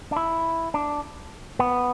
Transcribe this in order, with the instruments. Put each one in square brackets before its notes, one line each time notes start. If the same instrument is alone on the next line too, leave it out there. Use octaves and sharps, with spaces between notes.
[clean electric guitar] D4
E4
D4
B3